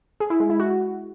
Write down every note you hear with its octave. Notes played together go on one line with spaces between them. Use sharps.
G#4
E4
G#3
E4
F#4